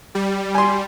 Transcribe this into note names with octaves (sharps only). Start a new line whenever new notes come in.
G3
G#5 C6